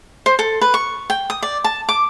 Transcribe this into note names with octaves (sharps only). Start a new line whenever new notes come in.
C5
A4
B4
C#6
G5
D#6
D5
A5
D6